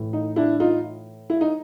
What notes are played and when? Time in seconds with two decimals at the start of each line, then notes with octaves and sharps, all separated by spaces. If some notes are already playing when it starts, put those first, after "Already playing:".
Already playing: A2 E3
0.13 D#4
0.36 D4 E4
0.60 D#4 F4
1.30 E4
1.41 D#4